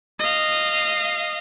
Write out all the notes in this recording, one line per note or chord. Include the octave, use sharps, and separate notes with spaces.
D#5 F5